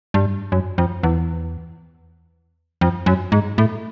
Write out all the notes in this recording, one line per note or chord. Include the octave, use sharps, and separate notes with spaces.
G2
F#2
F2
E2
F2
F#2
G#2
A2